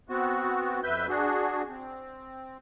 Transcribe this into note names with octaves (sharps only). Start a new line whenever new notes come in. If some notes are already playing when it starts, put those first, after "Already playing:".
B3 C4 F#4
F2 B4 E5 G6
D4 F#4 G#4
C4